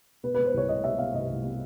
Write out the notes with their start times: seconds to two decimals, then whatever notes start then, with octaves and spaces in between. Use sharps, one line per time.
0.23 B2 B4
0.34 B2 B4
0.46 C5
0.54 C2 C#5
0.69 C2 D#5
0.84 B2 E5
0.98 B2 F5
1.14 C2 D#5
1.29 C2
1.44 B2